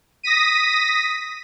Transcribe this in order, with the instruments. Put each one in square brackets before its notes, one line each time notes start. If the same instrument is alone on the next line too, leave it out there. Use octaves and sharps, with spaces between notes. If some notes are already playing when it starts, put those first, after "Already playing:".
[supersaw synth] D#6 A#6 B6 D#7